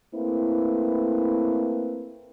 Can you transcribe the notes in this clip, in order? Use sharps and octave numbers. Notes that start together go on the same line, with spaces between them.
A3 A#3 C4 E4 B4